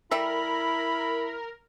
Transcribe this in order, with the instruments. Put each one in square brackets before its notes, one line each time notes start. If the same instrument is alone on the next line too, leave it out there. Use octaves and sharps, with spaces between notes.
[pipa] G3 A4 E5 [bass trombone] E4 [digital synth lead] A#4 [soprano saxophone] B5